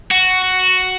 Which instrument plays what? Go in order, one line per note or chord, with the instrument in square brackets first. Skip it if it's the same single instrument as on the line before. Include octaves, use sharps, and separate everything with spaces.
[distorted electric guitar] F#4